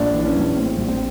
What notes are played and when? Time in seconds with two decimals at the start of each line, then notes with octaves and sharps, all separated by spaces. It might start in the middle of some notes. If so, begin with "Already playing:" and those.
Already playing: A#1 D4
0.14 E3
0.25 C#4
0.36 A#1
0.56 A2 C4
0.78 A#1
0.88 C4